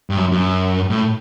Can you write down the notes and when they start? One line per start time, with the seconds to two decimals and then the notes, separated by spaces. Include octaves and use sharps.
0.10 G2
0.17 F#2
0.32 F#2
0.90 A2